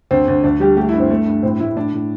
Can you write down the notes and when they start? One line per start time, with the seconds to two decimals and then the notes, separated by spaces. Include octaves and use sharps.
0.11 D2 C4
0.28 D2
0.43 D2 D4
0.60 G3 G4
0.77 A3 G4
0.89 E4
0.94 G2
1.00 C4
1.10 G2 A3
1.26 G2
1.43 A2 C4
1.60 A2 E4
1.76 A2 D4
1.93 A2